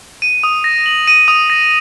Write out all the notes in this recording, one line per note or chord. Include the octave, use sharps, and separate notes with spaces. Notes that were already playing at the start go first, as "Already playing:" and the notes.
D#7
D#6
A#6
F#7
D#7
D#6
A#6